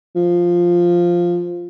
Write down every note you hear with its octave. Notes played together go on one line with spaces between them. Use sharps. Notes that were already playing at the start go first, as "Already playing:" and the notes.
F3